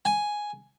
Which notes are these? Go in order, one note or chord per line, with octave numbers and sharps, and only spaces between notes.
G#5